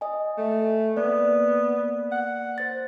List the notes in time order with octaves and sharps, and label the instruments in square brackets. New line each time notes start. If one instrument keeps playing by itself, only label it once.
[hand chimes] D#5 G#5
[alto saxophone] A3
[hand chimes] A#3 D5 [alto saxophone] B3
[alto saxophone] F#5
[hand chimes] C5 A6